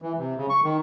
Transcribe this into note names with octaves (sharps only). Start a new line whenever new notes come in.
E3
C3
C#3
C#6
D#3